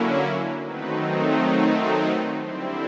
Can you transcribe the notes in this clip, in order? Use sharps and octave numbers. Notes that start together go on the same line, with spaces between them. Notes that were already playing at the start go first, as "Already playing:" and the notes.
Already playing: D3 F#3 A#3 C#4 E4
D#3 F#3 A3 C4 D#4 B4
B4
C5
B4
D3 G3 C4 E4 C5